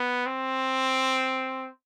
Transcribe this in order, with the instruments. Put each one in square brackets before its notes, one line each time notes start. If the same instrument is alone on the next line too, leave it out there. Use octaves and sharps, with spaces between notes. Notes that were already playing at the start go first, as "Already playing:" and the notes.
Already playing: [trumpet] B3
C4